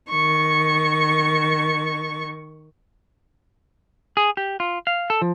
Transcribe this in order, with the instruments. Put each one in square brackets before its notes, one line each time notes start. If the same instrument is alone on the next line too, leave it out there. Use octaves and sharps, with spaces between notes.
[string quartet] D#3 C#6
[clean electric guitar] G#4
G4
F4
F5
A4
F3